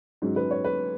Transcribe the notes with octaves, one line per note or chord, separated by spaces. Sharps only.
G#2 F#3 C#4
B4
C#5
B4